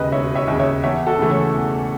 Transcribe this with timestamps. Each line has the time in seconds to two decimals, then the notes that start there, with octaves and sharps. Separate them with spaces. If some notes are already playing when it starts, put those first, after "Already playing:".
Already playing: E1 D#2 C#3 B4 D#5
0.12 E1 C#5 E5
0.35 C#5 E5
0.48 D#2 C#3
0.60 C#5 E5
0.83 E2 C#5 E5
1.07 F#4 A4
1.19 C#3 E3 A3
1.30 A4 C#5
1.54 E2